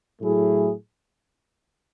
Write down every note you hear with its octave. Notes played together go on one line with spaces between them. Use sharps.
A2 F#3 A3 E4 G#4